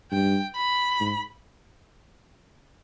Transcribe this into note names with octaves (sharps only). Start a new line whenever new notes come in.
G2 G5
B5
G#2